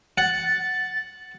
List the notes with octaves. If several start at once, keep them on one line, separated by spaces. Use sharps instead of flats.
F#5 A6